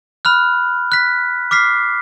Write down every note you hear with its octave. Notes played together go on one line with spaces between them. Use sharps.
B5 F6 F#6
F#6 B6
D6 F6 B6 C7